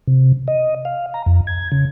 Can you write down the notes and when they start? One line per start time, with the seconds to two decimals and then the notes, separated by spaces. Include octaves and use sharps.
0.07 C3
0.48 D#5
0.85 F5
1.14 A#5
1.26 F2
1.47 G#6
1.72 C#3